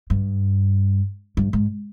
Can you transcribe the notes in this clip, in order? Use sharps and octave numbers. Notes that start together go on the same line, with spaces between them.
G2
G2
G#2